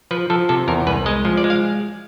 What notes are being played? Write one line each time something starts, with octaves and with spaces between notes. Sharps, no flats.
F3 B4
F3 A4
C3 A4
E2 A#4
C2 B4
G#3 D#5
F3
D5
G#3
F5